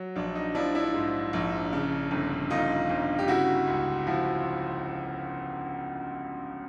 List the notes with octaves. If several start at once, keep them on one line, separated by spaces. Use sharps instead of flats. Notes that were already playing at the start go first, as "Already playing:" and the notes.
Already playing: F#3
A#1 D4
D#4
F3 D4 E4
D4 E4
G#2
A#1
C#3
G1
G1 D#4 F4
G1
G4
C#3 E4 F#4
C#2
F3 E4 F#4